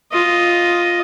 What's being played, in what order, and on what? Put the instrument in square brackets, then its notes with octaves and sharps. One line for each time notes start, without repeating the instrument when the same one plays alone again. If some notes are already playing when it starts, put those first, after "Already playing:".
[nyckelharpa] F4 D#5